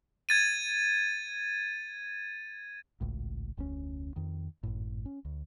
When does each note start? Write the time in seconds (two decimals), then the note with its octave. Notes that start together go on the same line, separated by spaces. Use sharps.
0.29 G#6 A6 D#7
3.01 G#1 C#2 A2
3.57 F1 D2 B2 C#4
4.16 F2 D#3
4.63 G#1 F#2 A2
5.06 C#4
5.25 D2